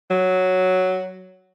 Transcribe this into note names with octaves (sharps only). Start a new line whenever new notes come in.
F#3